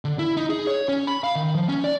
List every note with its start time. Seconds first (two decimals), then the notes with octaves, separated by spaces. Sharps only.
0.05 D3
0.19 E4
0.37 D#4
0.50 G#4
0.67 C#5
0.89 C#4
1.07 B5
1.24 F5
1.36 D#3
1.55 F3
1.69 C#4
1.84 D5